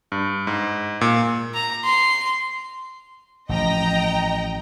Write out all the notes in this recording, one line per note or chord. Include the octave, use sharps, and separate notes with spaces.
G2
G#2
A#2
A#5
C6
A1 F3 D#5 G5 A#5